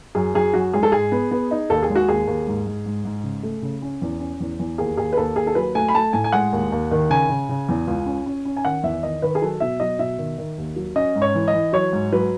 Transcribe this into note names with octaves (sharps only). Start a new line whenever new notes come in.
F#2 G#4
F#2 G#4
F#2 F#4
G#3 G#4
A4
G#2 G#4
B3
B3
D#4
D#2 A4
G#4
G#3
F#4
D#2 G#4
D#2
G#2
G#2
G#2
G#2
C#3
A3
C#3
C#4
E2
C#4
E2
E2
D#2 G#4
D#2 G#4
B4
D#2 A4
D#2 G#4
A4
F#3 B4
A3 G#5
B5
A3 A5
A2 G#5
G#5
G#3 F#5
D#2
D#2
D#3
C#3 G#5
C#3
C#3
E2
C#2
C#4
C#4
C#4
G#5
D#3 F#5
E2 E5
D#3 D#5
D#3 B4
G#4
F#3 A4
B2 E5
F#3 D#5
B2 E5
D#3
D#3
D#2
F#3
C#4 D#5
G#2
C#5
E3
D#5
E3
F#3 C#5
G#2
F#3 B4